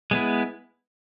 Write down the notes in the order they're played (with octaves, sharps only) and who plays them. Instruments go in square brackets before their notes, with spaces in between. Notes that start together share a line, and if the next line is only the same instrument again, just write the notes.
[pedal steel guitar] G#3 B3 E4